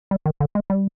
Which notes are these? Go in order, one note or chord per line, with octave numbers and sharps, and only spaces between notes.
G3
D#3
D3
G#3
G3